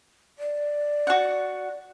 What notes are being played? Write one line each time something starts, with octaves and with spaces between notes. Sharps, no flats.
D5
F#4 F#5